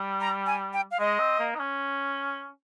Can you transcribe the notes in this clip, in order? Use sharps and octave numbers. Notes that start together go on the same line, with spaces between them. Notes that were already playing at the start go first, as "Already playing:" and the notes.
Already playing: G3
A#5
G#5
G5
F5
G#3 D#5
C4
A#3
D#4
C#4